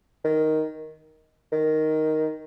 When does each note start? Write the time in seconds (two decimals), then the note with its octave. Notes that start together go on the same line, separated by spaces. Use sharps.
0.24 D#3
1.52 D#3